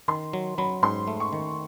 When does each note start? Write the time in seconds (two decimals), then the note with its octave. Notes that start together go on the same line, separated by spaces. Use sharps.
0.08 D#3 C6
0.33 F#3
0.58 F#3 B5
0.83 G#2 C6
1.08 A3
1.20 C#6
1.33 D#3